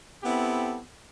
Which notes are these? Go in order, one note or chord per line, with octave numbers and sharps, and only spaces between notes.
B3 C4 E4 G4 A4